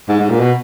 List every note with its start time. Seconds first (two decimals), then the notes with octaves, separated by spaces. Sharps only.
0.09 G#2
0.20 G#2
0.30 A#2
0.40 B2